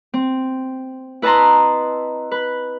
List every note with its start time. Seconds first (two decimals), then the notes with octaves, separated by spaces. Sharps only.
0.14 C4
1.22 E4 B4 D#5 A5 A#5 C6
2.31 B4